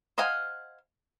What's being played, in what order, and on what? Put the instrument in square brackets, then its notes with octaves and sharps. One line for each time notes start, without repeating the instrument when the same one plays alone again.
[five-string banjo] C5 D#5 F5 F#5 G#5